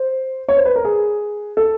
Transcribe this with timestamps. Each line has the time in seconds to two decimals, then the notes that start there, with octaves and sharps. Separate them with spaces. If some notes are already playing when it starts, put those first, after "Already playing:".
Already playing: C5
0.48 C#5
0.57 C5
0.66 B4
0.76 A#4
0.85 G#4
1.57 A4